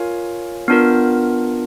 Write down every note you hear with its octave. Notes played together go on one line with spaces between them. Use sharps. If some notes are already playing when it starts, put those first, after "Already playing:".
Already playing: F4 A#4 C#5 F5 G#5
B3 D4 F4 A#4